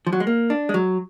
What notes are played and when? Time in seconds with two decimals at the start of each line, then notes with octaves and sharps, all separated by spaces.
0.07 F3
0.13 F#3
0.20 G#3
0.27 A#3
0.50 D4
0.69 G#3
0.74 F#3